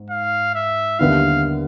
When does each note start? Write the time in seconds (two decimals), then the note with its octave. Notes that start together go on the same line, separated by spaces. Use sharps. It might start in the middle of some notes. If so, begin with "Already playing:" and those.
Already playing: G#2
0.10 F5
0.55 E5
0.99 D#2 D3 G3 B3 E4 F5